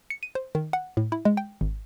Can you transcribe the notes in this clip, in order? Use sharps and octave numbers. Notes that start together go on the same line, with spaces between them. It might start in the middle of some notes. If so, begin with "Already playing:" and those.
C#7
D#7
C5
D#3
F#5
A2
E4
G#3
G5
G#1